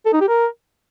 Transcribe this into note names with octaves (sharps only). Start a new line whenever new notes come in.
A4
D#4
G4
A#4